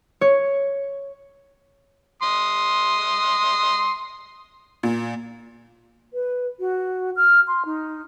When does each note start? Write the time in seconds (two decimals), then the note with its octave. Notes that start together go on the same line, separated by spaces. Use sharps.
0.21 C#5
2.22 C6 D#6
4.83 A#2
6.13 B4
6.60 F#4
7.16 F6
7.48 C6
7.65 D#4